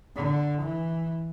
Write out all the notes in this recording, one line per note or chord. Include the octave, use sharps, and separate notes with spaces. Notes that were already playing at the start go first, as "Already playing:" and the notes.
D3
E3